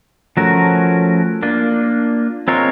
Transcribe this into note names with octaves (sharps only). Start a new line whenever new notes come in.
F3 A3 C#4 F#4 A#4
A#3 D4 F4
G#3 C4 F4 A#4 C#5